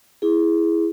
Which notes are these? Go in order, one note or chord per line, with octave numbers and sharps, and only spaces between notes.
E4 G#4